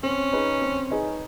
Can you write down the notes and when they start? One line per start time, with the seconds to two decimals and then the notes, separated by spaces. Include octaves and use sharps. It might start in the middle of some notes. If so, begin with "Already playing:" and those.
0.03 C4 C#4
0.33 D#4 G#4 B4 D#5
0.62 C4
0.91 D#4 G#4 B4 D#5